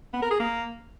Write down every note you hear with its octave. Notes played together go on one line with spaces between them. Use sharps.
B3
A#4
G#4
A#3